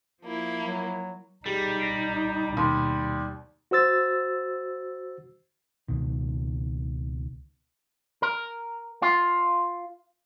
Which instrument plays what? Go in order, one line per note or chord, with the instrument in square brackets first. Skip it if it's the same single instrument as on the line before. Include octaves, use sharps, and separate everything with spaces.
[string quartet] F3 A#3 E4
[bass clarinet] F#3
[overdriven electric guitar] G3 [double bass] D#4 [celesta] G4 G#4
[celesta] A#6 C7 D7
[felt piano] D#2 [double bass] B2 [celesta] G5 C6
[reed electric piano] F#4 C5 E6 A6
[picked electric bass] C#2 B2 D#3
[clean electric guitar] A#4
F4